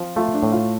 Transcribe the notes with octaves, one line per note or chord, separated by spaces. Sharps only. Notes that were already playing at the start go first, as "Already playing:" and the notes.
Already playing: F3 C4
A3 F4
D4
A2
F4